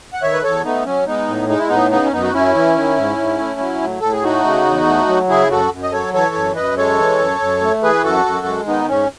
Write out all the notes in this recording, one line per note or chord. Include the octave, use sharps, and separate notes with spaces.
F#5
D#3 C#5 E5
B4
E2 A4 C#5
A3 B3 D#4
F#3 C#4
G#3 B3 D#4
A2
G#3 D#4
E4
A2 B3 D#4
C#3 B3 D#4
C#4
F#2 B3 D#4
F#4
F#2 C#4 E4
E3
D#3
G#2
G#2
A3
F#3
A2
A2 A4
G#4
A3 D#4 F#4
C#3
E2
A3
F#3
C#3 E4 G#4
F#2 F#4 A4
F#2
D#5
F#3 A4 C#5
E3 A4 C#5
F#2
F#2 B4 D#5
G#3 A4 C#5
E3
F#2
F#2
A3
E3 G#4 B4
F#2 F#4 A4
F#2
G#3
D#3 B3 D#4
G#2 C#4